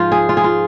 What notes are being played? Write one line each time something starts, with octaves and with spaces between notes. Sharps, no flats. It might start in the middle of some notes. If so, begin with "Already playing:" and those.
Already playing: G#2 F3 F4
G#4
F4
G#4
F4